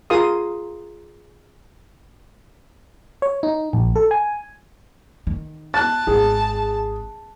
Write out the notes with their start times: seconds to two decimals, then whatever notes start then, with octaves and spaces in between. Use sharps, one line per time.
0.10 F4 G#4 A#4 F5 C6 D#6
3.22 C#5
3.43 D#4
3.73 A#1
3.96 A4
4.11 G#5
5.27 D#3
5.74 A5 F#6 A6
6.07 G#1 G#3 G#4